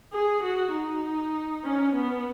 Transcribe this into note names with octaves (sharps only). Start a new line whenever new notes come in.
G#4
F#4
D#4
C#4
B3